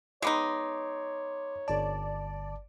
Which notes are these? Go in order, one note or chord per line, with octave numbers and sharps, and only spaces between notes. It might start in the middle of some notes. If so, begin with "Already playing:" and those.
G#3 B3 D#4 C#5 C6 D6
G1 D5 A5